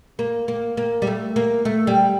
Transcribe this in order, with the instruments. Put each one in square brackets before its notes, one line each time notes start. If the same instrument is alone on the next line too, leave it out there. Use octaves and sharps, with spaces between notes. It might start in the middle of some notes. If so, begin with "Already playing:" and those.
[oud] A#3
A#3
A#3
G3
A3
A#3
A3
G3